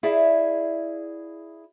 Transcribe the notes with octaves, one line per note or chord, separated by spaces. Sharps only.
E4 G#4 D5 E5 F5